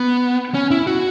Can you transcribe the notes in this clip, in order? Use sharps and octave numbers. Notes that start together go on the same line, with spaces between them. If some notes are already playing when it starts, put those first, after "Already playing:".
Already playing: B3
C#4
E4
F#4